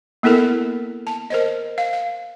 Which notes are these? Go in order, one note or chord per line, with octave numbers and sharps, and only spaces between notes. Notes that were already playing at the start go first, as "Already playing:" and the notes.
A#3 B3 E4 A4 A#4
A5
A#4 C5 D#5
F5
F5